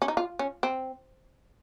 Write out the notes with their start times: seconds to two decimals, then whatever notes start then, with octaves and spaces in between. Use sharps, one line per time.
0.02 C#4
0.08 D#4
0.17 F4
0.39 C#4
0.63 C4